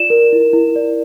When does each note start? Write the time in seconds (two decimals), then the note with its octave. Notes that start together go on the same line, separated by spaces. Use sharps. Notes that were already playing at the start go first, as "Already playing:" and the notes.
Already playing: F4 D5 E7
0.10 A#4
0.33 E4
0.53 E4
0.76 D5